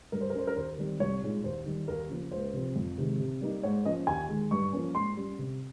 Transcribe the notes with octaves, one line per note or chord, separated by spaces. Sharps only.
G2 A#4
C5
A#4
G3 C#4 C5
A#4
D#2 C5
D#3 G3 C4
C2 C#5
A#2 G#3 D#4
D#2 C5
D#3 G3
D#2 A#4
C#3 F3 A#3
C#2 C5
C3 F3 C4
F2
C3 D#3 G#3
C3
G3 A#3 D#4
G#2 C#5
F3 A#3 C#4 D#5
D#2 G#5
D#3 G#3
G2 C#6
F3 A#3 C#4
G#2 C6
G3 C#4
C3